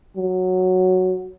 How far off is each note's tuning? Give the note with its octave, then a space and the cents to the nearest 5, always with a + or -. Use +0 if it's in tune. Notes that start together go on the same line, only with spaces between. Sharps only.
F#3 -5